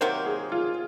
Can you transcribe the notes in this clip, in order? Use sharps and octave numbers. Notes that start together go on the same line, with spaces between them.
C3 D#3 F#3 A#3 C5
G#4
F4